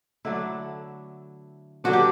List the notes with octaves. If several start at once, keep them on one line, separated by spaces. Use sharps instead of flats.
D3 F#3 A3 D4 E4
D3 F#3 B3 D4 F#4
G4